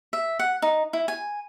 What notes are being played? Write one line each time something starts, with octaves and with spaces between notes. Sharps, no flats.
E5
F#5
D#4
E4
G#5